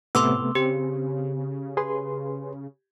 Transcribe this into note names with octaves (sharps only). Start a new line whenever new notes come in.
A2 C3 A3 B3 C6 D6 E6
C#3 C4 G4
G#4 B4 C6